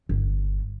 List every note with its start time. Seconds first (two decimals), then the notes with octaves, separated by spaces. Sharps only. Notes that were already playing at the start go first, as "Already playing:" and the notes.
0.09 G1